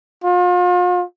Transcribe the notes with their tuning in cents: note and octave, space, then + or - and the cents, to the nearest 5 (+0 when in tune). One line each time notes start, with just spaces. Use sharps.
F4 +40